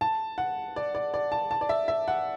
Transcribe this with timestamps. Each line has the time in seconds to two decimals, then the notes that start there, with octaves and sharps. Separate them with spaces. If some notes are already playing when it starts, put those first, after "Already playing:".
0.01 A5
0.38 F#5
0.76 D5
0.95 D5
1.14 D5
1.32 A5
1.51 A5
1.61 D5
1.69 E5
1.88 E5
2.08 F#5